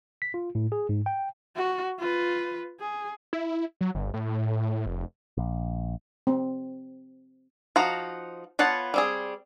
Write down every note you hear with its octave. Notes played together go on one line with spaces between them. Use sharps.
B6
F4
A2
G#4
G#2
G5
F#4
F4 B4
G#4
E4
F#3
G1
A2
F1
A#1
C4
F3 D#4 F#4 A#5
B3 F4 C#5 F#5 A5
G3 C4 G#4